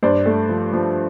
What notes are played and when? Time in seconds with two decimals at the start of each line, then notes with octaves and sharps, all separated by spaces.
0.03 G2 C5 D5
0.26 A3
0.49 F3
0.73 F3